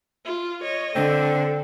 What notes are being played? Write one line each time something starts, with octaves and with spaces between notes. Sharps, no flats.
F4
C#5 D#5
D3 C4 A4